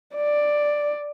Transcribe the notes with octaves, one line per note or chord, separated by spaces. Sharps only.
D5